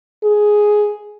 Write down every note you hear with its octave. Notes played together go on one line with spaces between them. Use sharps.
G#4